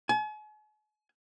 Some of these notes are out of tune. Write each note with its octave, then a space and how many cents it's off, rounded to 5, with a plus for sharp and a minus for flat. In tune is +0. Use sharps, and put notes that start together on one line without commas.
G#5 +45